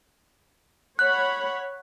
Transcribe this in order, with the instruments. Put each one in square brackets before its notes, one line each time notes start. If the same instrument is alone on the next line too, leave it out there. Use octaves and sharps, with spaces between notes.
[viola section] C#5 F#5 B5 [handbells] F#6